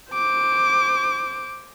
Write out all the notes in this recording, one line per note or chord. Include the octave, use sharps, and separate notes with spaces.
C5 D6